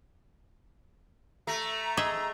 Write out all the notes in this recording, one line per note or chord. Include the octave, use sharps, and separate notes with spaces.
A3 A#5
G#4 D#5 E5